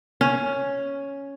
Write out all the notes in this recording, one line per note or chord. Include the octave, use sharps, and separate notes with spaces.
C#4